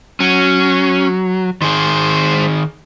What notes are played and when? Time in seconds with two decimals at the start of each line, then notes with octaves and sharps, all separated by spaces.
0.20 F#3 C#4
1.62 D#3 G#3 G#4 C5